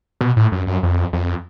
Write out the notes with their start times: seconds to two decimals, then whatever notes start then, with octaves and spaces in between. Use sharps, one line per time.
0.21 B2
0.36 A2
0.52 F#2
0.67 F#2
0.83 F2
1.13 F2